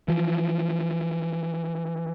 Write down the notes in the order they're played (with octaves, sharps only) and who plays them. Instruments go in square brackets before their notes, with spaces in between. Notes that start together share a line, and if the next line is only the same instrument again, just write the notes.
[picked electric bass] E3 F3